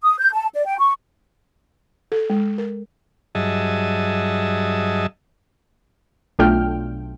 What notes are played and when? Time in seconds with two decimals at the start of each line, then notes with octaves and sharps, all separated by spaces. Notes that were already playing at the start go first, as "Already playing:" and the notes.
0.03 D#6
0.19 G6
0.33 A5
0.54 D5
0.66 G5
0.79 C#6
2.12 A4
2.30 G#3
2.58 A#4
3.35 G2 F#3 G#4 D#5 E5 A5
6.39 B1 A3 D4 F4 G5 F6